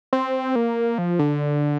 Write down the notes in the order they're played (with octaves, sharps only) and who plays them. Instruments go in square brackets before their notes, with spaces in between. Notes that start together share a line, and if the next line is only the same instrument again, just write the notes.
[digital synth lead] C4
A#3
F3
D3